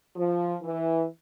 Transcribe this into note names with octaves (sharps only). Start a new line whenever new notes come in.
F3
E3